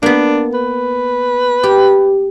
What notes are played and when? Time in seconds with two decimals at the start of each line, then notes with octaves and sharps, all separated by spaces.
0.03 A#3 B3 D4
0.54 B4
1.63 G4